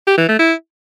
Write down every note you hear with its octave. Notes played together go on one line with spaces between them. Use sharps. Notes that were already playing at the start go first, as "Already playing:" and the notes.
G4
E3
A3
E4